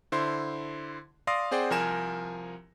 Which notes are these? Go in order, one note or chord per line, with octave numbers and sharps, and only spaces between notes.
D3 E4 C5 C6
D5 F5 C6 D#6 A#6
C4 G#4 C5 D5 F#5 G5
C2 F3 A#4 G#5 E7